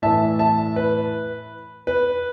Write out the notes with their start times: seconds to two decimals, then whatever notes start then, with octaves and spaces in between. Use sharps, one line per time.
0.02 A2 E3 E5 A5
0.39 E5 A5
0.76 B4
1.87 B4